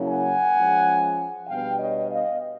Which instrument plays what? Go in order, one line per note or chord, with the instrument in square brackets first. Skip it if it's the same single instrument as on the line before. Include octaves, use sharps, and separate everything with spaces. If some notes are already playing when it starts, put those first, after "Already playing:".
Already playing: [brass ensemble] C#3 F#3 A#3 C#4 E4
F#5 G#5
F3 G#3 C#4
B2 G3 B3 D4 F5 G5
C#5 D#5
D#5 F5